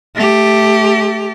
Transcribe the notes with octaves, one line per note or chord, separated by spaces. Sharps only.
A3 G4